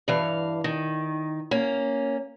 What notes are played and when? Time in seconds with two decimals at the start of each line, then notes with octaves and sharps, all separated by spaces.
0.08 G2 E3 F5
0.64 D#3
1.51 A#3 C#4